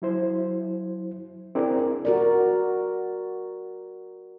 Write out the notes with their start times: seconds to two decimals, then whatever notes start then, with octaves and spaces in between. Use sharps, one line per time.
0.02 F#3 E4 C5
1.55 C4 D4 E4 G#4 A#4 D5
2.05 F#4 A#4 D5